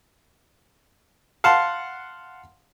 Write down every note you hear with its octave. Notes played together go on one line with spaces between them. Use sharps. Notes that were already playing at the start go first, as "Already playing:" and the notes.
F5 F#5 A5 C6